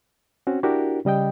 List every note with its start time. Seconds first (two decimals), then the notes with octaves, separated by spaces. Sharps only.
0.47 C4 C#4 F#4
0.63 D4 E4 F#4 G4 A#4
1.05 C#3 G3 D#5 G5